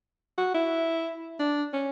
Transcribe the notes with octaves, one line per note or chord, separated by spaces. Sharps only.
F#4
E4
D4
C#4